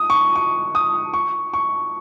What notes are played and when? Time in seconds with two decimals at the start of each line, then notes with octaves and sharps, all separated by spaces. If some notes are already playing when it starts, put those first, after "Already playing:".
Already playing: D#6
0.10 C#6
0.36 C#6
0.75 D#6
1.14 C#6
1.53 C#6